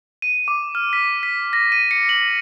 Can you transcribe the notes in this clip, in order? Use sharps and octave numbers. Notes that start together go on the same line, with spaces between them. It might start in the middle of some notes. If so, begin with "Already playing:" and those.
D#7
D6
F6
B6
B6
A#6
D#7
C#7
F#7